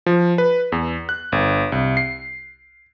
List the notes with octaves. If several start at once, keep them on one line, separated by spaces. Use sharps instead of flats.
F3
B4
E2
F#6
G1
C2
C7